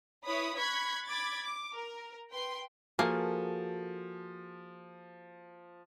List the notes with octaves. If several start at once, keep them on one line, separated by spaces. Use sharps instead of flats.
E4 B4 C#5 B5 D#6
B5 C#6 F#6 G#6 B6
B5 D6 G#6 A6
D6
A#4
B4 G5 C6
F3 A#3 F#4 G#4 A4